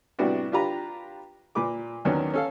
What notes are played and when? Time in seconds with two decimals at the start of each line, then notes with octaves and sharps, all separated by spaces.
0.19 A2 C3 G3 B3 D4 F#4
0.52 D4 F4 G4 B4 A#5
1.55 A#2 B4 D6
2.05 D#2 D#3 F#3 B3 C#4 D4
2.33 C#4 A4 F5